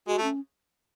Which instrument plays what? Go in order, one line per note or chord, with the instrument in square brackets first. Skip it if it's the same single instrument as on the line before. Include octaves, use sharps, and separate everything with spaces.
[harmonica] G#3 [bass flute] F#4
[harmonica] A3
[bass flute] C#4